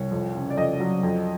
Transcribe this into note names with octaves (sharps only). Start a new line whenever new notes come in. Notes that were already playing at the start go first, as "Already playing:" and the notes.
Already playing: C2 C#5
F2
C#3
D5
F2 D#5
F#3
F2